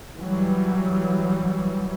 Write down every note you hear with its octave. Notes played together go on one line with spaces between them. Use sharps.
E3 F#3 G3